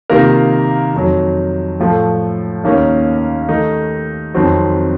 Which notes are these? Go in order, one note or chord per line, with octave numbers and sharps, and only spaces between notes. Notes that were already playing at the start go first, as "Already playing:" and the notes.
C3 D#3 A#3 F4 A#4
F2 D#3 F#3
A2 F3 A3
D#2 D#3 A#3 C#4
D#3 A3 D#4
F2 D#3 F#3 C4 F#4